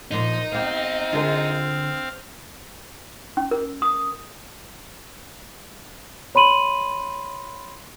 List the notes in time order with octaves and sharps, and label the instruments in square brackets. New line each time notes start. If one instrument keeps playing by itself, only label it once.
[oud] A#2 F3 D4 [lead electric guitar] D#4
[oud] B3 G4 [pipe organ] C4 F5
[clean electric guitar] D3 [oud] F4 G#4 A#4
[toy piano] C#4
A#4
D#6
[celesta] C#5 B5 C6 D#7 F#7